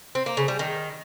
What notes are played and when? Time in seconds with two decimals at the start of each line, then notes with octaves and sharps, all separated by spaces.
0.15 C4
0.26 A#3
0.37 C#3
0.48 G3
0.59 D#3